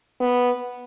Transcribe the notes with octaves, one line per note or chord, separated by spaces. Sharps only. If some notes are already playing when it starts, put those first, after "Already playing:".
B3